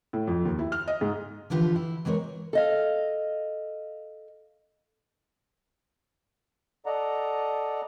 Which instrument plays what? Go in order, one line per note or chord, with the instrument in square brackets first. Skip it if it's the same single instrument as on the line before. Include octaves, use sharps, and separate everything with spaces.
[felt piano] A2
F2
D#2
E4
F6
D#5
G#2
[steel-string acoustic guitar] D3 E3 F3 F4 G4 B4
E4
E3 G#3 C4 A#4 C#5
A4 D#5 F5
[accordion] A4 D5 D#5 F#5 A#5